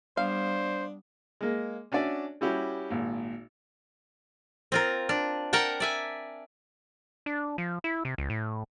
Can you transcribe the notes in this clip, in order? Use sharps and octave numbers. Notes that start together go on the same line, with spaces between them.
G3 B3 D4 C5 F5
G#3 A#3
C#4 D4 F#4 D5 E5
G3 C#4 E4 F#4 G4
G#1 A#2
C4 F4 A#4
D4
A#4 F#5 G5 A5
D5 E5 G#5
D4
F3
E4
C3
C#2
A2